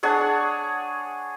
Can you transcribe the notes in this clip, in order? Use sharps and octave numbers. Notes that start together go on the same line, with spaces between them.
D4 G#4 C#5 F#5